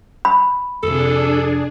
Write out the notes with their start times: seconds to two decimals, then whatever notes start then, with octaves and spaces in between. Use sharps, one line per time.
0.25 B5
0.83 F2 C3 D4 G#4 A4